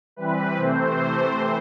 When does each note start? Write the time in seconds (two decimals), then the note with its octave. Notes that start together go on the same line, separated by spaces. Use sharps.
0.16 E3 G3 C4 B4
0.57 C3 E3 A3 C4 C5